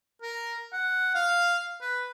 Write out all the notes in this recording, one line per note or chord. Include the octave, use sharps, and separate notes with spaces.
A#4
F#5
F5
B4